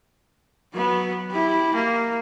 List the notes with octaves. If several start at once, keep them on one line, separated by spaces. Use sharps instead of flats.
F#3 B3
E4 G4
A#3